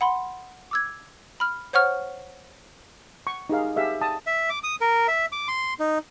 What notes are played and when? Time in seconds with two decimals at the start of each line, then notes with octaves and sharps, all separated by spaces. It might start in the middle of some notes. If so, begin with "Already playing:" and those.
0.01 F#5 B5 C6
0.71 D6 E6 G#6
1.40 B5 F6
1.73 C5 C#5 F#5 C#6 F6
3.27 C#6
3.49 D#4 G4 G#4 F5
3.76 G4 G#4 E5 F5
4.01 G5 A5 D#6
4.27 E5
4.50 D6
4.64 D#6
4.81 A#4
5.08 E5
5.32 D6
5.48 C6
5.79 D#4